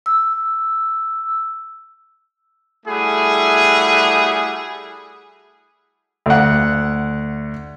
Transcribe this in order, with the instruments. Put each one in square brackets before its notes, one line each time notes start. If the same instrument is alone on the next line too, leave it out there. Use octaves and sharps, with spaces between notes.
[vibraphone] E6
[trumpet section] G3 A3 E4 F#4 G#4
[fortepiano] D2 F#5